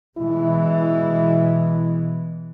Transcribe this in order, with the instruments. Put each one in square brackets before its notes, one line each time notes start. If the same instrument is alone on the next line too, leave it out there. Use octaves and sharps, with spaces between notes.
[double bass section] B2 E3 G#3 [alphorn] E4